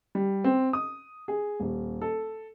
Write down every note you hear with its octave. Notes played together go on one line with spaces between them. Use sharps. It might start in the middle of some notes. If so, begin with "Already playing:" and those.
G3
C4
D#6
G#4
D#1
A4